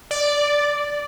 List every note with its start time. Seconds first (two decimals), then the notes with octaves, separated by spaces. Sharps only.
0.11 D5